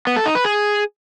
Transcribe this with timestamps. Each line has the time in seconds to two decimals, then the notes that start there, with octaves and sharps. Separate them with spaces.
0.07 B3
0.16 A4
0.26 D#4
0.35 B4
0.45 G#4